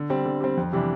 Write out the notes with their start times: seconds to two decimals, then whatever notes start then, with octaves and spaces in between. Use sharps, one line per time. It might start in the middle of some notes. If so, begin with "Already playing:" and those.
Already playing: D3
0.10 G3 C4
0.25 D3
0.41 G3 C4
0.57 F2
0.73 C3 E3 G3 D4